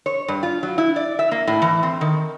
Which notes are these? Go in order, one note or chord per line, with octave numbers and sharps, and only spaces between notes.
C#5
G2
F4
F#3
E4
D5
E5
A#3
A2
E3
C4
D#3